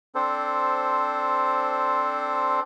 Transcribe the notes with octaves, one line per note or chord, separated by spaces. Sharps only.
C4 D4 A4 C5